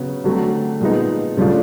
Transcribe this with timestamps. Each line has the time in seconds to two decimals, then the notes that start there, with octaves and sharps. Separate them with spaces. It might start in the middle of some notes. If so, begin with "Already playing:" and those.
Already playing: C#3 F#3 B3
0.24 D3 F#3 A3 C4
0.81 A#2 F3 G#3 B3 D#4
1.37 C#3 F3 A3 D4 F4